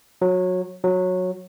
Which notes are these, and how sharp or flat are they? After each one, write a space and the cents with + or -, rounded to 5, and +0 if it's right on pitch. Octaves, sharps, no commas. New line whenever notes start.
F#3 -20
F#3 -15